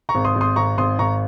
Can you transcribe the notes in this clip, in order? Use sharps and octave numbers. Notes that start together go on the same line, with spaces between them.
A#5 C#6
G#1
C6 D#6
G#1
C6 D#6
G#1 A#5 C#6
G#1 C6 D#6
G#1 A#5 C#6